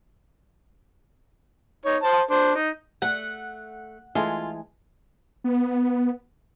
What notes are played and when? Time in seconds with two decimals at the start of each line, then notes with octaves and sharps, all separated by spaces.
1.85 D#4 C#5
2.03 C5 A5
2.31 D4 C5
2.55 D#4
3.02 A3 F#5
4.15 E3 G#3 A3 F4
5.44 B3